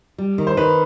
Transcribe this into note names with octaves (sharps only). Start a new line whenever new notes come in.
G3
D#3
C5
D#3 B4